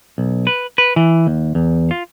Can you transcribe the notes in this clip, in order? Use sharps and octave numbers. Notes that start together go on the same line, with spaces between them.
B1
B4
B4
E3
D#2
E2
F4